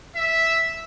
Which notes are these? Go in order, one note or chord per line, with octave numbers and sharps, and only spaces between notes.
E5